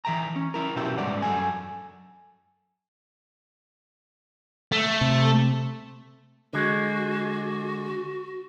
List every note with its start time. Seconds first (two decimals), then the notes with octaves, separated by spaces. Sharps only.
0.05 E3 E5 G5 A#5
0.36 C#4
0.54 E4 A#4
0.76 B2 F#3 C#4 G4 E5 G5
0.97 G#2 G3 C#4 D5 F#5
1.22 F#2 A4 G#5
4.72 A3
5.01 C3
6.53 D3 G#3 F#4